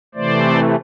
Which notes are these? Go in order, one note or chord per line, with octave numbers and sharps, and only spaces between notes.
C3 E3 A3 C5 D5